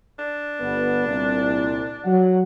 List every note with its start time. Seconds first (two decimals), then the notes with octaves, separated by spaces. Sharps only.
0.19 D4
0.60 G1 B3
1.07 C2 A#2
2.05 F#3 F#5